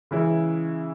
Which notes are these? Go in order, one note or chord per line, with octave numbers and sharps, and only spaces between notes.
C#3 E3 G#3 C#4 E4